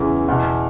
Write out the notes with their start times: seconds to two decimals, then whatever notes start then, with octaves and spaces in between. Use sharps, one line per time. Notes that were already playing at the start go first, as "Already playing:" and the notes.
Already playing: E2 C#3 E3
0.28 E2 B2